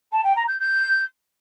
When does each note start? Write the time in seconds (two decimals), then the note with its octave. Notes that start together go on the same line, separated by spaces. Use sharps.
0.12 A5
0.24 G5
0.35 A#5
0.47 G6
0.59 G6